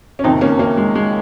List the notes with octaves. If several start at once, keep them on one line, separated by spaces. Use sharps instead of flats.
C#4
F#1 F2 C3 D#3 C4 D#4
A#3 C#4
A#3
G#3
G#3